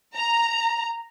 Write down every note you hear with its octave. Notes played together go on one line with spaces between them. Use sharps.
A#5